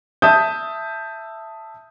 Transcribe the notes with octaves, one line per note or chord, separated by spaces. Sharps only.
E5 A5 D#6 G6